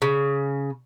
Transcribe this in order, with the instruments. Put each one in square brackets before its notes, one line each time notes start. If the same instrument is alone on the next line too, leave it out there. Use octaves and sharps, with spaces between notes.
[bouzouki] C#3